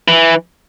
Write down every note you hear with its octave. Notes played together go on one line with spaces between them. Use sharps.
E3